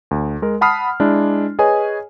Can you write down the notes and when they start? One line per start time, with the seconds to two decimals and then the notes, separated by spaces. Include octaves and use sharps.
0.11 D2
0.42 G#3 A#4
0.61 F#5 A5 B5 D#6 F6 C7
1.00 G#3 D4 E4
1.59 G#4 B4 C#5 D#5 G#5